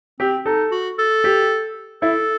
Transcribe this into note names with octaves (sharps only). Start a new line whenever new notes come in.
C4 G4
D#4 A4
F#4
A4
G4
E4 A4